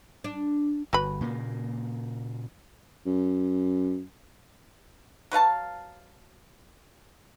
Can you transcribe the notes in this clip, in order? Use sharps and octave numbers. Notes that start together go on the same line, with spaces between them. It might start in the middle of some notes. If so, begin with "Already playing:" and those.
D4
G1 F#4 B4 B5
A#2 C#3 A#3
F#2
F#3 B4 F5 A5